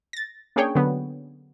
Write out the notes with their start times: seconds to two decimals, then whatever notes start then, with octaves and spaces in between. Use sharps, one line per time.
0.13 A6 A#6
0.56 A#3 C#4 D4 G#4 C#5 G5
0.75 D3 F#3 B3